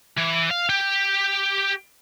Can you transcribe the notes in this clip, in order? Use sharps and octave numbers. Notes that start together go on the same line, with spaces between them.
E3
F5
G4